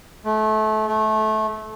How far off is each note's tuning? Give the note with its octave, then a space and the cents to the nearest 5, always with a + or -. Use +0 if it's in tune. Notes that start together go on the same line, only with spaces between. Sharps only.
A3 -25
A3 -20